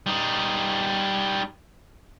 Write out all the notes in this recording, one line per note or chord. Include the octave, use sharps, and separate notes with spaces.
G3 D#4